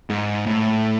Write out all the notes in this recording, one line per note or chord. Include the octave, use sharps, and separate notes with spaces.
G#2
A2